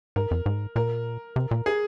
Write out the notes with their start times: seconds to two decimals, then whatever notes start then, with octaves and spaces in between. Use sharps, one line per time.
0.16 G#2 A#4
0.31 F2
0.46 G#2
0.76 A#2 A#4
1.36 C3
1.51 A#2
1.66 G#4